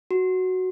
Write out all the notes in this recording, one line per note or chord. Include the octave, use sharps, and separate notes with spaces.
F#4